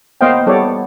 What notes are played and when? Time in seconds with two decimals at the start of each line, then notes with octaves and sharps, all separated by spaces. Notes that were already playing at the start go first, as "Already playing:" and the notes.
0.21 A#3 B3 C5 D#5 F5 G5
0.46 G3 B3 A4 C#5 D5